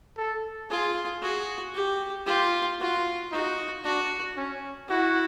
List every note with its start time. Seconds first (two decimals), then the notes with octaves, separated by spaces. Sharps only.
0.17 A4
0.70 F4 G#4
1.22 F#4 G#4
1.74 G4
2.26 F4 G4
2.80 F4 F#4
3.31 D#4 F#4
3.84 D4 F#4
4.37 C#4
4.89 E4 F#4